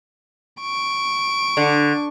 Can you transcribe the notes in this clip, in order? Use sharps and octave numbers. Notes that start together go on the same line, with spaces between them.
C#6 D7
D3